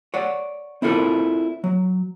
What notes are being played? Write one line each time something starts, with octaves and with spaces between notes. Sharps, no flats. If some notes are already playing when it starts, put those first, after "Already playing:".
C#5 D5 F#5
C4 E4 F4 A4 A#4
F#3